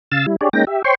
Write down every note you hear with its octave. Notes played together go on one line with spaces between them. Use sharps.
C#3 F5 E6 A6
G3 E4
D4 G4 G#4 C#5 D5
G#3 A#3 C#4 D#4 G5 A#6
G4 E5
C5 C#5 G5 C6 C#6